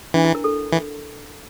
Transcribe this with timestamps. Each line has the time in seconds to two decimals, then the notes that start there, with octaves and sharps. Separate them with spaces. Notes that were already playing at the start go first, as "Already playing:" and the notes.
0.14 E3 D4
0.24 E4
0.35 A#4
0.44 A4
0.72 E3